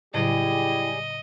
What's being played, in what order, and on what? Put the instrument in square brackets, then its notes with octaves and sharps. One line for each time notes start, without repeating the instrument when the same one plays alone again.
[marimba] A2 C#3 F#3 [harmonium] G3 G4 G#4 [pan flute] E4 [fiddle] D#5